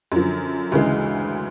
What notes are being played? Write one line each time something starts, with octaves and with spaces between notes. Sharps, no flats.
F#2 D3 F3
D2 C#3 E3 G#3